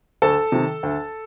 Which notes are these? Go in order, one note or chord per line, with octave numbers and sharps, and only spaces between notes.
D2 A4 A5
C3 D#3
D2